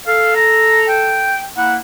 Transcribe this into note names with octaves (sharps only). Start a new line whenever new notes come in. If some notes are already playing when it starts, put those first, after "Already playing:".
A4 F5
A#5
G5
A#3 E4 F#5